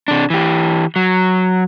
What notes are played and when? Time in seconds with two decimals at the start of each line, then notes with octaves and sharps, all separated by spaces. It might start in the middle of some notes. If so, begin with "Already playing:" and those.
0.08 C3 D4
0.30 E3 G4
0.96 F#3